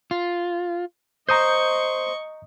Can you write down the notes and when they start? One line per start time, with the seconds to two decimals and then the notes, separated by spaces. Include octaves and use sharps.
0.11 F4
1.29 C5 D#5 A#5 C#6 D#6 G6